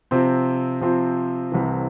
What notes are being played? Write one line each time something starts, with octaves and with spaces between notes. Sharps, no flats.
C3 F3 C4
C3 F3 C4
C2 C3 E3